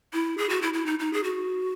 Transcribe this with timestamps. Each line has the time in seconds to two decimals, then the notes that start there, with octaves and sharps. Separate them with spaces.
0.13 E4
0.38 G#4
0.49 F#4
0.62 E4
0.74 E4
0.86 D#4
0.99 D#4
1.13 G#4
1.24 F#4